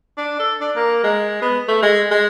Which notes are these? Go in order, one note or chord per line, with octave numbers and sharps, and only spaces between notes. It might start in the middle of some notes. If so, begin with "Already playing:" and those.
D4
A4
D4
A#3
G#3
B3
A3
G#3
G#3